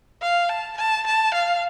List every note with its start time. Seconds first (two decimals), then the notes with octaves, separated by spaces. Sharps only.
0.22 F5
0.50 A5
0.78 A5
1.07 A5
1.34 F5